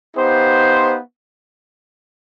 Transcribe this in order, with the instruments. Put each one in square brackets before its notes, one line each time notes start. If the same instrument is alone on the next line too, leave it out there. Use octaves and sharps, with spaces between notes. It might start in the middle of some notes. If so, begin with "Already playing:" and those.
[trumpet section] B3 D#4 G4 C5 F5